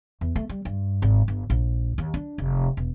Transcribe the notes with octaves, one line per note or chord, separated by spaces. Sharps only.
E2
A3
G3
G2
G#1
G1
A#1
D#2
D4
F1
E1